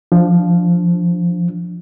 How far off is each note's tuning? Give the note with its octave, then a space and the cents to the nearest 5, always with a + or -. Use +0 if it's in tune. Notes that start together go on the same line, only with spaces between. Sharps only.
F3 +0 D4 +0